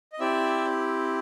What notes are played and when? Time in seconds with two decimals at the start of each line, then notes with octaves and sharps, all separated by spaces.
0.12 D#5
0.20 C4 E4 G4 D5 E5